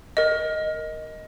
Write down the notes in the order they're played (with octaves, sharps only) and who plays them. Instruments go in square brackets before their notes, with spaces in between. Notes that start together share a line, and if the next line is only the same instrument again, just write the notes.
[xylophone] A#4 D#5